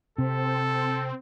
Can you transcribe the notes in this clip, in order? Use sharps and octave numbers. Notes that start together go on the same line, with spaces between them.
C3 C4 A4